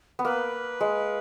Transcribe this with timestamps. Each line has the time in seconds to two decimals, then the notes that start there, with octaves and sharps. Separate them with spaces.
0.19 B3
0.25 A#3 B4
0.80 G#3